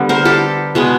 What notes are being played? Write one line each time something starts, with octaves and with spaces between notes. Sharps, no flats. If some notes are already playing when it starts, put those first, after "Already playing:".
Already playing: D3 G3 B3
A#4 C5
G4 A4
B2 G#3 B3